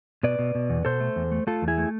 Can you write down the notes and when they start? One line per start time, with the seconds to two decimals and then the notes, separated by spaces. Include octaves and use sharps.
0.23 B2 B4 D5
0.39 B2
0.55 B2
0.70 E2
0.85 B2 A4 C5
1.00 A3
1.16 E2
1.32 A3
1.47 A3 F4 A4
1.62 E2
1.68 E4 G#4
1.78 A3